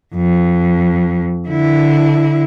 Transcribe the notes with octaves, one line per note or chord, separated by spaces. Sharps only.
F2
D3 E4